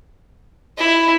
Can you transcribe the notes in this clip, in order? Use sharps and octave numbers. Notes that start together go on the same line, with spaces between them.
E4